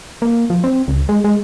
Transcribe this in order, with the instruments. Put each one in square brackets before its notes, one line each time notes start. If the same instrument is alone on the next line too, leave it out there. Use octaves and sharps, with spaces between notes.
[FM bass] A#3
F3
C4
C#2
G#3
G#3